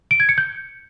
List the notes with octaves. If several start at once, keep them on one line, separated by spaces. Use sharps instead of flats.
D7
G#6
C#7
G6